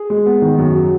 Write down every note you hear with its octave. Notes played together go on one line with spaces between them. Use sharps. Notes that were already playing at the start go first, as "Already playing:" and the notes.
Already playing: G#4
G#3
B3
D#3
F#2
F#3